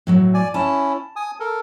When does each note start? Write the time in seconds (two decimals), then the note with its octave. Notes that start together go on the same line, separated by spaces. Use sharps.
0.07 A2 F#3 F#4
0.34 D5 G#5
0.54 C#4 E4 A5
1.16 G#5 D#6
1.40 A4 A#4